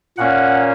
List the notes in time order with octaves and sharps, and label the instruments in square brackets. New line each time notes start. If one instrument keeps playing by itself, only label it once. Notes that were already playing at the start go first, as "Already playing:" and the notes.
[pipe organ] A#2 A#3 C#4 F#5